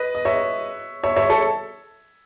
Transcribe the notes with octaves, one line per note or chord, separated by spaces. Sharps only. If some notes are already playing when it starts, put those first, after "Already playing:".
Already playing: B4 D#5
D#5
C#5 E5
C#5 E5
C#5 E5
A4 C#5